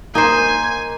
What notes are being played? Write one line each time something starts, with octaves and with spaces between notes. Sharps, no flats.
A#3 D#4 C5 G#5